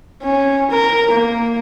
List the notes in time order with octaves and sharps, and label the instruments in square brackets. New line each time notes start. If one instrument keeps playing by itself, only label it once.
[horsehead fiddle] C#4
A#4
A#3